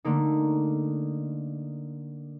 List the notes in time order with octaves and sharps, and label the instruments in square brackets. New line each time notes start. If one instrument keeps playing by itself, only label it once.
[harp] D3 A3 A#3 D#4